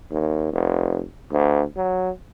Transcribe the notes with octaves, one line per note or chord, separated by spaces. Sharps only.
D#2
F1
D2
F#3